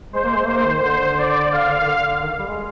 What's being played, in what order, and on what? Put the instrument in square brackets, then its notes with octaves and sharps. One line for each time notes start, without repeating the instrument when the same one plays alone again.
[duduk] G#3 [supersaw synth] C5
[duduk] A#3
G#3
[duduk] A#3 [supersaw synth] C5
[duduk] D#3
[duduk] D3 [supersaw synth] C5
[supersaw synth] D5
[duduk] D3 [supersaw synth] F5
[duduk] D3
D#3
D3
D3
D#3
G3
G#3